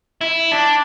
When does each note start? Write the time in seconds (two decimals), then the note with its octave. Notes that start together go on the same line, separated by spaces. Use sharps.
0.21 E4
0.52 D4